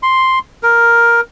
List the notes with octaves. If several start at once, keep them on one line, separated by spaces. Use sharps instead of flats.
C6
A#4